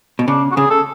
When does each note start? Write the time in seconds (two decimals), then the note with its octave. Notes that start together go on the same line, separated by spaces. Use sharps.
0.19 B2
0.28 C#3 D4
0.51 F#4
0.56 C#3 G#4
0.70 A4